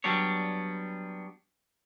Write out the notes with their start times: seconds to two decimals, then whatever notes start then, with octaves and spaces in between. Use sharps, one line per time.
0.04 F#3 G3 B3 D4 C#5